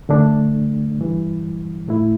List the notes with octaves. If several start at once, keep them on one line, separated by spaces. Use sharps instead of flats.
D2 D3 A3 D4
G2 E3 G3
A2 A3 E4